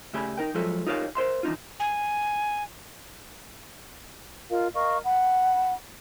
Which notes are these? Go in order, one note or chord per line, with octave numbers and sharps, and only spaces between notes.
C#3 A3 G4 D5 G#5 B5
D#4 A#4 G5
F3 F#3 G#3 F4 A4 E5
D#4 F4 G4 A#4 C#5 F5
A#4 C5 E5 C6
E3 D4 D#4 F4
G#5
F4 A#4 D#5 F5
A#4 D#5 F5 C#6
F#5 B5